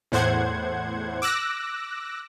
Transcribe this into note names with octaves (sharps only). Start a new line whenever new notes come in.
E2 A2 C5 F#5 G#6
D6 E6 F#6 A#6